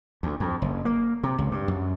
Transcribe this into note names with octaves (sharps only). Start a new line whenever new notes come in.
D2
F2
F#1
A#3
C3
C#2
G2
F#2